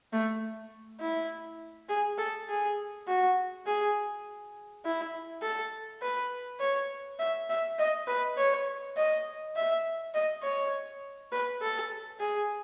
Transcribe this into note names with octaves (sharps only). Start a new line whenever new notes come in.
A3
E4
G#4
A4
G#4
F#4
G#4
E4
A4
B4
C#5
E5
E5
D#5
B4
C#5
D#5
E5
D#5
C#5
B4
A4
G#4